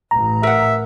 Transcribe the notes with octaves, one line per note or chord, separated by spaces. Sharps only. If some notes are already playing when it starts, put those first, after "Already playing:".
A1 A#5
A#4 E5 F#5